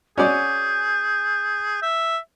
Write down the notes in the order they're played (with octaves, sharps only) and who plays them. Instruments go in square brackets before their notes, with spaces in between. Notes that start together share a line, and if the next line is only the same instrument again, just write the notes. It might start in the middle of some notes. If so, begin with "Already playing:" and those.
[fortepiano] C#4 F#4 D5 [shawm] G#4 [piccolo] G6
[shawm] E5